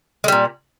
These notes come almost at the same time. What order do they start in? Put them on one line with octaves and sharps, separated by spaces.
G#3 G3 A#2